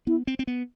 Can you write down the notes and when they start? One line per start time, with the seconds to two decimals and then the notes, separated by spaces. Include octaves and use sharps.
0.07 B3 E4
0.27 C4
0.39 C4
0.47 B3